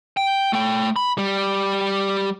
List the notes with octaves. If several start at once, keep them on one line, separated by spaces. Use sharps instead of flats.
G5
A3 G5
B5
G3